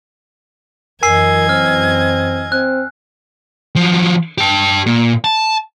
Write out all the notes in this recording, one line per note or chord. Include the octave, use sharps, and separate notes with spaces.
F#2 E3 A#4 D#5 G#5 E6 G#6 C7
C4 F6
C4 F#6
F3 F#3
G4 A5
A#2
A5